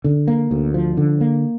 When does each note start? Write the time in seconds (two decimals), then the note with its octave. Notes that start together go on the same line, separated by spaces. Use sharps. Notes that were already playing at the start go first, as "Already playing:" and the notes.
0.04 D3
0.28 A#3
0.51 D2
0.74 F3
0.97 D3
1.21 A#3